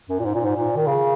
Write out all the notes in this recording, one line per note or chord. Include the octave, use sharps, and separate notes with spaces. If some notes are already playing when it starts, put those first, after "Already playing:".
F#2
A#2
G#2
A#2
G#2
A#2
D#3
C#3